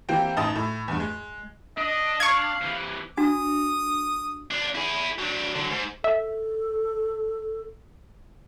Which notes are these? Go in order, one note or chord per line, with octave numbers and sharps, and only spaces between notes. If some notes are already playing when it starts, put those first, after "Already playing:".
E3 A#3 C4 G4 G5
A1 D#4 A5 D#6
A2
E2 G2
G#3
D4 D#5
F5 C#6 G#6
C3 E3
D4 F#4 D#6
D4 F4
E4 G#4
F#3 D4
D3 F#3
G#2
A4 E5